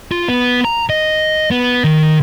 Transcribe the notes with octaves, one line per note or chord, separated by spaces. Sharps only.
F4
B3
A#5
D#5
B3
D#3